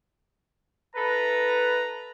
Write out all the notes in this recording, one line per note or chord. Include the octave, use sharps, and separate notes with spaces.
E4 A4 B4 A#5